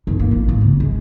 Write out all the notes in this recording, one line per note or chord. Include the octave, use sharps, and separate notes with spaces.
G2 D#4
A#3
A1
G#1
C#3
G#3